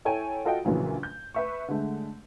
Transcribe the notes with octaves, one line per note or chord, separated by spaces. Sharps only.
E4 A4 C#5 G5 G#5
F4 F#4 A4 D#5 F5 G5
A#1 A#2 C#3 E3 F#3
G6
B4 E5 C#6
D3 G#3 A3